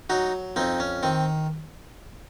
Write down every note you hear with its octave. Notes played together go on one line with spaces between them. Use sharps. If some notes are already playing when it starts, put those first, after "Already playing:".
F#3 D#4 F#4
F2 C4 D#4
C#4
D#3 C4